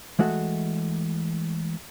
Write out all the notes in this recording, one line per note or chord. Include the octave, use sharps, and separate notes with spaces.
E3 G#3 A3 F#4